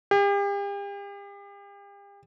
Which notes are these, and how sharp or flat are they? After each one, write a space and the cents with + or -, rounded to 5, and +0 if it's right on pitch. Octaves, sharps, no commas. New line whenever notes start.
G4 +40